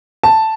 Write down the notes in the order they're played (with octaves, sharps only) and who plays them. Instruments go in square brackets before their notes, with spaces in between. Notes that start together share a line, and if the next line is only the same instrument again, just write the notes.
[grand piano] A5